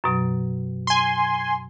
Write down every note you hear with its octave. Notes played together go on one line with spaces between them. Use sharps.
F#2 B2 F#3
G#5 C6